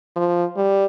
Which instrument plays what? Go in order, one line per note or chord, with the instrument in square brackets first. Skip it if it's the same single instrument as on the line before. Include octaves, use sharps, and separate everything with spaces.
[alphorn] F3
G3